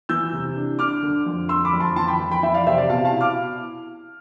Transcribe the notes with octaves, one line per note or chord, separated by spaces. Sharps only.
E3 E6 G6
C3
D4
D4 D6 F6
D3
F2
D3 C6 E6
B5 D6
F2
A5 C6
E3 A5 C6
G5 B5
F2
G5 B5
E3 E5 G5
D5 F5
C3 C5 E5
D5 F5
B2 F5 A5
F5 A5
E4
D6 F6